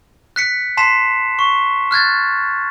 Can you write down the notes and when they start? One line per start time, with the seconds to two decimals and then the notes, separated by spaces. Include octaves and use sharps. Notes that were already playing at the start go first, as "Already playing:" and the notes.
0.36 F#6 B6 C#7
0.77 A5 C6 B6 C7 E7
1.39 C#6
1.91 F6 F#6 G#6 A6